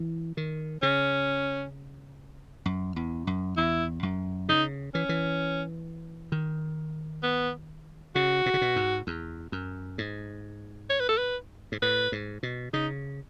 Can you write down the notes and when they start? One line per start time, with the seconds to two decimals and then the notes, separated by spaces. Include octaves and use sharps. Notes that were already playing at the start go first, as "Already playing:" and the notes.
Already playing: E3
0.37 D#3
0.82 C#3 C#4
2.66 F#2
2.96 E2
3.27 F#2
3.57 E2 E4
4.03 F#2
4.49 C#3 D#4
4.94 E3 C#4
5.09 E3
6.32 D#3
7.23 B3
8.15 C#3 F#4
8.46 B2
8.54 C#3
8.61 B2
8.76 G#2
9.07 E2
9.52 F#2
9.98 G#2
10.90 C#5
11.00 B4
11.09 A4
11.18 B4
11.72 G#2
11.82 A2 B4
12.12 G#2
12.43 B2
12.73 C#3 D#4